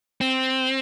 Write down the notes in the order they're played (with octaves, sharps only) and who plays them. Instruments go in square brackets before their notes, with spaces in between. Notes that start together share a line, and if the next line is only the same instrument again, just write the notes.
[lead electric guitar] C4